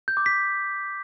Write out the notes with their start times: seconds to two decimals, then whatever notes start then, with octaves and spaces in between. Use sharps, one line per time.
0.08 G6
0.17 D6
0.26 B6